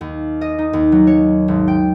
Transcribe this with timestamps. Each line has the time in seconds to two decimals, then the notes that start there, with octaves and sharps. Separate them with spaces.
0.01 D#2
0.41 D#5
0.58 D#4
0.73 D#2
0.92 F#3
1.07 C#5
1.48 G#1
1.68 G5